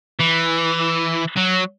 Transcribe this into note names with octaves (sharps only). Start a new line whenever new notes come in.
E3
F#3